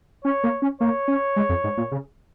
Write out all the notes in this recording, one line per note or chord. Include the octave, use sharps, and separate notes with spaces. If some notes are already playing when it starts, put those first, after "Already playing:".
C#4 C#5
A#3
C#4
A#3 C#5
C#4
G#3
F2
G#2
A#2
C#3